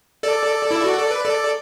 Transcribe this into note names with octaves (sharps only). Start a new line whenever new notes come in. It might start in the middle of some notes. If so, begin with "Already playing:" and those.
A4 D5
E4
F#4
A4
B4
A4 D5